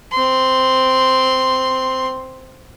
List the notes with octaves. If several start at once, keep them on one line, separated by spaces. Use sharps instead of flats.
C4 C6